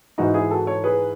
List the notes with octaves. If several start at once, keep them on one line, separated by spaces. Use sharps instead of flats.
G#2 E3 D#4 F#4
E4 G#4
F#4 A4
A4 C#5
G#4 B4